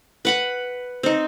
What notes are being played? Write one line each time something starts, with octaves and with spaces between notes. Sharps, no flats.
B4 F#5 B5
C4 D#4